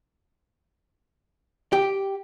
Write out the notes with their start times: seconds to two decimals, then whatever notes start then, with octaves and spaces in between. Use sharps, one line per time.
1.73 G4